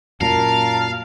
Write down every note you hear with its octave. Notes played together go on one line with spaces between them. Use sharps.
F#2 A#2 A#4 F5 A5 F6